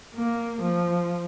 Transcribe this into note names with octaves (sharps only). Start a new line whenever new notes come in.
A#3
F3